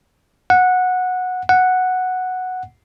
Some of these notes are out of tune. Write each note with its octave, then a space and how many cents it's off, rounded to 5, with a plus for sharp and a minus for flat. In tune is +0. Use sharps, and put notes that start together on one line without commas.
F#5 -15
F#5 -5